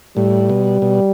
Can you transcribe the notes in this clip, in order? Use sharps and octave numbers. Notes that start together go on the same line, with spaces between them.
A2 G3
B2
B2